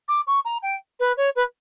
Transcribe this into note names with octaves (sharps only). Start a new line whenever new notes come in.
D6
C#6
A#5
G5
B4
C#5
B4